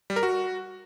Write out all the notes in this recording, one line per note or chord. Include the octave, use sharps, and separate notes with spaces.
G3
A#4
F#4